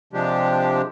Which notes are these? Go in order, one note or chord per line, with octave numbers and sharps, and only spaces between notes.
C3 F3 G#3 D4 G4